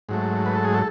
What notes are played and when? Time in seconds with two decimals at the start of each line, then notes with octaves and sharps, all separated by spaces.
0.09 G#2 F#3 A3
0.46 B4
0.55 A4
0.65 G#4
0.74 A4